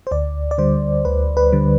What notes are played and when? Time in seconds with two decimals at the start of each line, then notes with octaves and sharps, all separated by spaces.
0.07 C5
0.11 D2 D5
0.51 D5
0.58 D3 G3 C5
1.05 D2 B4
1.37 B4
1.52 D3 G3